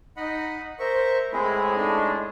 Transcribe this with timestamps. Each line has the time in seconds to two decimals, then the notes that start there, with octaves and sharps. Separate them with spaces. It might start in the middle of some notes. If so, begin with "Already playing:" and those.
0.17 D#4 D#5 F#5 B5
0.79 A#4 C5 E5 C#6
1.33 A2 G#3 C4 E4 G#4 B5
1.76 A3 D4 D#4